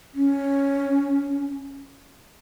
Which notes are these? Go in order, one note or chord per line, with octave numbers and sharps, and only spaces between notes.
C#4